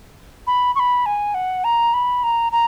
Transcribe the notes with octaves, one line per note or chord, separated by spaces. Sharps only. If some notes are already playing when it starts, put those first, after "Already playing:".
B5
C#6
B5
G#5
F#5
A#5
B5
A#5
A#5